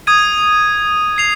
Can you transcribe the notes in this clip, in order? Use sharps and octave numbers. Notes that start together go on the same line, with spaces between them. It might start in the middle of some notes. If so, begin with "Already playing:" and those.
D#6 G#6 D#7
G#6 C7 F7